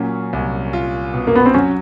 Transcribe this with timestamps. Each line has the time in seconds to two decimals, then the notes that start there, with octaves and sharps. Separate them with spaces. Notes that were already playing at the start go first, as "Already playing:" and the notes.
Already playing: A#2 F#3 C#4
0.33 C2
0.73 F4
1.14 B2
1.27 A#3
1.35 B3
1.46 C4
1.54 F#3 C#4